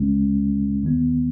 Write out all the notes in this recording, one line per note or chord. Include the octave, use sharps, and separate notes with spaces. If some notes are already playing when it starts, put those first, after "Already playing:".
Already playing: C#2 C#3 G#3 C#4
D#2 D#3 B3